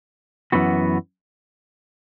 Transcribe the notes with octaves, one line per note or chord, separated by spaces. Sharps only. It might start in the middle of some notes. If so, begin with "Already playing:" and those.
F#2 E3 B3 F#4